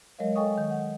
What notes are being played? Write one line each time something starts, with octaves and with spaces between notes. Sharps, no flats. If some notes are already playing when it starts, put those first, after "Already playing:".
F#3 G#3 A#4 C#5 D#5 F5
A4 D#5 G5 G#5 C#6 D#6
D#3
F#5